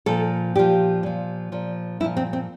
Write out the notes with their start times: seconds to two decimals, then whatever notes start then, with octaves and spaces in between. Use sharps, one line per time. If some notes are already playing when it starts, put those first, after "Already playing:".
0.06 A#2 F3 A4
0.55 A#2 F3 G4
1.03 A#2 F3
1.52 A#2 F3
2.00 F3 E4
2.04 A#2
2.17 C4
2.33 C4